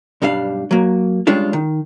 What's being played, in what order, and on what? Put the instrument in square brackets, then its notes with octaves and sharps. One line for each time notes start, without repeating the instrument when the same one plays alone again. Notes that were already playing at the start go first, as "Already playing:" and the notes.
[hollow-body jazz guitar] B1 G2 G3 D4 F5
F#3 A#3
G3 G#3 C#4 D4 F4
D#3